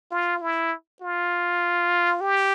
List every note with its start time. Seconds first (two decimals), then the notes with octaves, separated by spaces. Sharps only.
0.11 F4
0.42 E4
1.02 F4
2.21 G4